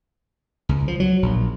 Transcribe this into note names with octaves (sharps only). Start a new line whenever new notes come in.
C#2
F3
F#3
A#1